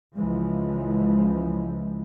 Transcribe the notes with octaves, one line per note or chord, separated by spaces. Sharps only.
C#2 E3 F3 G#3